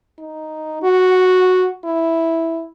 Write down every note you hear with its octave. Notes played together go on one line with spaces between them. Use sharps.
D#4
F#4
E4